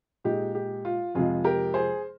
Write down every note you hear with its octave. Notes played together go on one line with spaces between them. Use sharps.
A#2 G#3 D#4 G4
G4
F4
F2 C3 F3 G#3 F4 G#4
G4 A#4
G#4 C5